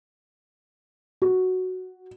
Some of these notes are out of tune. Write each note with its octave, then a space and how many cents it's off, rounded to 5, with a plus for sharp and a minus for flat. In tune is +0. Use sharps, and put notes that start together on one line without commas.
F#4 +0